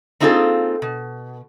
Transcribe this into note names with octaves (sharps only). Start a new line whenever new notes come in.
A#3 C4 D#4 F4 G#4 A4
B2